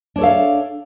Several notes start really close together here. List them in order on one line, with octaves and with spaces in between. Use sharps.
D4 C#5 A4 F5